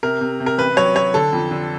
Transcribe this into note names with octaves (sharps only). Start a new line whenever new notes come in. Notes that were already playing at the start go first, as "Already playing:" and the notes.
C3 A#4
C3
C3
A#4
A1 B4
F#3 C#5
F#3 C#5
D3 A4
F2
D3